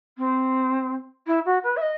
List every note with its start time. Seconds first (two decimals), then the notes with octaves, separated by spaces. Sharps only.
0.18 C4
1.27 E4
1.45 F#4
1.63 B4
1.76 E5
1.82 D#5